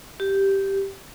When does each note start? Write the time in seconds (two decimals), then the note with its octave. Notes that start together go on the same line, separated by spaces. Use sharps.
0.20 G4